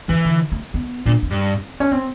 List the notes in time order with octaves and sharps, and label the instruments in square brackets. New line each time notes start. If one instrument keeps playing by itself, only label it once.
[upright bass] D#3 [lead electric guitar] E3
[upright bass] D3
A3
B3
[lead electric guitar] A#2 [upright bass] D4
[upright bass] C4
[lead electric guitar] G2
[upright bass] C#4
C4